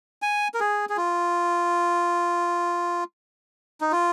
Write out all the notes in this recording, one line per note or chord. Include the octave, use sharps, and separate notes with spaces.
G#5
A#4
G#4
G#4
F4
D#4
F4